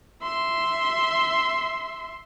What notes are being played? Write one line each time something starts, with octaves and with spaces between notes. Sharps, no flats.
E5 C6